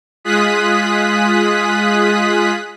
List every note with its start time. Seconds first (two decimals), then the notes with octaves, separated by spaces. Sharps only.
0.24 G#3 F4 G#4 D#6 F#6 B6